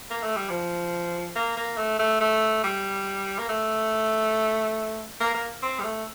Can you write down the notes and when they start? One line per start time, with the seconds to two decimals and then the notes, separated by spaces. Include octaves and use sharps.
0.11 A#3
0.23 A3
0.36 G3
0.49 F3
1.36 A#3
1.57 A#3
1.78 A3
1.99 A3
2.20 A3
2.64 G3
3.39 A#3
3.49 A3
5.20 A#3
5.35 A#3
5.63 C4
5.80 G3
5.84 A3